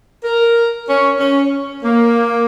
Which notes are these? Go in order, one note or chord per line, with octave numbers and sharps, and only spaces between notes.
A#4
C#4
C#4
A#3